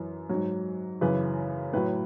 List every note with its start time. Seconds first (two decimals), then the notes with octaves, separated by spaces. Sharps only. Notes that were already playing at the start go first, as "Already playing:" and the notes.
Already playing: F#2 E3
0.30 G#2 F#3
1.01 F#2 C#3 E3 B4
1.73 A2 F#3 B4